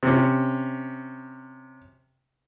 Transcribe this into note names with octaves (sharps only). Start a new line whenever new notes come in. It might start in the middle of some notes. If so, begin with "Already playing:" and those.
C3 C#4